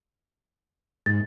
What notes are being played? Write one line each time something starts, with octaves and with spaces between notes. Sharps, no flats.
G#2 A6